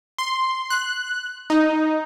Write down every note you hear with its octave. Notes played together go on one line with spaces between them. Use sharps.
C6
F#6
D#4